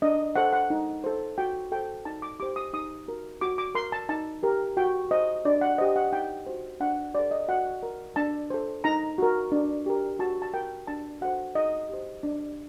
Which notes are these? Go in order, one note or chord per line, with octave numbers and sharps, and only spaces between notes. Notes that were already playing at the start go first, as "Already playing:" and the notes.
D4 D#5
A4 C5 F#5
F#5
D#4
A4 C5
F#4 G5
A4 C5 G5
D#4 A5
D6
G4 C5 D6
D#6
D#4 D#6
F#4 A#4
F#4 D6
D6
A#4 C6
A5
D#4 A5
G4 A#4
F#4 G5
C5 D#5
D4 D5
F#5
G4 C5 D#5
F#5
D#4 G5
F#4 C5
D4 F#5
A4 C5 D5
D#5
F#4 F#5
A#4
D4 A5
A4 C5
D#4 A#5
F#4 A#4
D4
G4 A#4
F#4 A5
A5
A#4 G5
D4 A5
F#4 A4 C5 F#5
D#4 D#5
G4 C5
D4